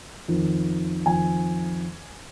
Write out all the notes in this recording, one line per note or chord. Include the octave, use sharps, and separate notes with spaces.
F2 D#3
F2 D#3 G#5